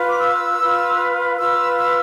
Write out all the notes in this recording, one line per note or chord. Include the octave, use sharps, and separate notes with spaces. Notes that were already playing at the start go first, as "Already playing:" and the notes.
Already playing: F4 B4
D6
E6
F4 B4
F4 B4 E6
E6